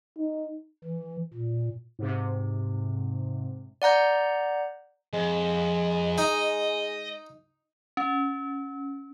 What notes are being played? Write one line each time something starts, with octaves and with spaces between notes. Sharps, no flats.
D#4
E3
A#2
G#2 C3
D5 F#5 A#5 G6
F2 G#3
D#4 D#5
C#4